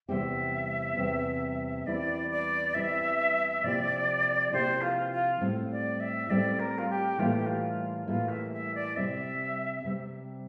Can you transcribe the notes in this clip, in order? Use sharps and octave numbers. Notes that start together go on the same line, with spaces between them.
E2 C3 G3 C4 G4 E5
E2 C3 G3 C4 G4
E2 E3 G3 C4 E4 D5
D5
E2 E3 G3 C4 E4 E5
C3 F3 A#3 E4 G4 D5
C3 F3 A#3 E4 G4 C5
F4
F4
A2 G3 C4
D5
E5
A2 G3 C4 D5
A#4
F4
G4
A2 E3 G3 A#3 E4 F4
G4
F4
A2 E3 G3 A#3 E4 F4
E5
E5
D5
C3 G3 C4 E5
C3 G3 C4